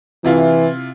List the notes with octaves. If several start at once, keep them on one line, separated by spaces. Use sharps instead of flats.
C3 E3 E4 F4